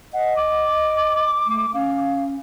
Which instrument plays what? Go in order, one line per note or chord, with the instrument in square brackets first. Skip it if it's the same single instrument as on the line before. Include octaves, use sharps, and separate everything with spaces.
[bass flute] D#5 [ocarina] F#5
[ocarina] D6
[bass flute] A3
[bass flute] C#4 [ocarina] F5